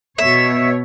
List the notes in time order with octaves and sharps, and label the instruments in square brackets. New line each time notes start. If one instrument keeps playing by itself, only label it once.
[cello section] B2 C#5 [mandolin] E5